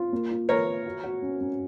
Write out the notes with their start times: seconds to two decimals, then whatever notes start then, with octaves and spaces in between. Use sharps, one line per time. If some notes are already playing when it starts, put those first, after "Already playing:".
Already playing: F4
0.12 A#3
0.31 F4
0.49 A#4 B4 C#5
0.67 B4
0.86 F#4
1.04 F#4
1.22 C#4
1.41 C#4